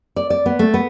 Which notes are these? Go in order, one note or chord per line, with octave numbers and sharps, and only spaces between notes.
D5
D5
B3
A3
B3